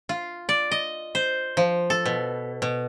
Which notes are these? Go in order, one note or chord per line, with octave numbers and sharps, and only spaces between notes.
F4
D5
D#5
C5
F3
A4
B2
B2